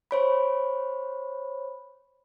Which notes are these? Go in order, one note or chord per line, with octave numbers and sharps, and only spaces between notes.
C5 C#5 B5